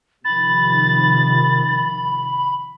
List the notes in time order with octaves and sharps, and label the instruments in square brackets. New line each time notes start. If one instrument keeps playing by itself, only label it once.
[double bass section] C3 D#3 F3 [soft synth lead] B5 [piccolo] A6